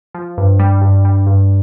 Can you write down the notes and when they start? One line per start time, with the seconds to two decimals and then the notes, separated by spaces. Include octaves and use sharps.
0.15 F3
0.38 G2
0.59 G3
0.82 G2
1.05 G3
1.27 G2